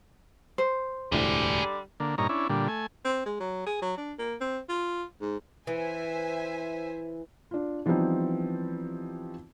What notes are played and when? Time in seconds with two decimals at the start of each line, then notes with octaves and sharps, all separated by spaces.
0.58 C5
1.12 E1 D2 A2 D3 G3 G#4 D5
2.00 D3 A#3
2.18 G2 A#2 D#4 C#5 A#5
2.29 C#4 D4 E4
2.49 A#2 D3 G3
2.68 A3 G#5
3.05 C4
3.26 G#3
3.40 F#3
3.66 G#4
3.82 F#3
3.97 D4
4.19 A#3
4.41 C4
4.69 F4
5.21 G#2
5.67 E3 C5 E5 G#5
7.51 D4 F4
7.86 E3 F3 G3 B3 C4 D#4